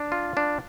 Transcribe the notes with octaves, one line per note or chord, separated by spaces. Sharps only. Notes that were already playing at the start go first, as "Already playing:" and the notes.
Already playing: D4
F4
D4